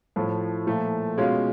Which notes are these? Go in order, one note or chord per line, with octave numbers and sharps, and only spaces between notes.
A2 F3 A3
A#2 F3 A3
B2 G#3 C#4 F4